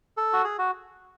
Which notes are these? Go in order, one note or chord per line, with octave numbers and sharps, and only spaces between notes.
A4
F#4
G#4
F#4